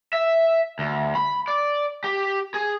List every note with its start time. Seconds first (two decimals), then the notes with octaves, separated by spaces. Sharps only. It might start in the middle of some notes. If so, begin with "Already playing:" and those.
0.13 E5
0.79 D2
1.15 B5
1.48 D5
2.04 G4
2.54 G#4